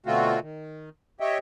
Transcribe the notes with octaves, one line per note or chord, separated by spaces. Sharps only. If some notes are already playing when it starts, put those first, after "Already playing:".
B2 D3 A3 C4 F4 F#4
D#3
G4 C#5 D#5 E5 G5